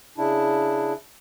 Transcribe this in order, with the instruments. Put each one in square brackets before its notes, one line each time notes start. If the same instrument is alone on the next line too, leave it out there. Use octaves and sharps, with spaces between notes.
[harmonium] C#3 D4 E4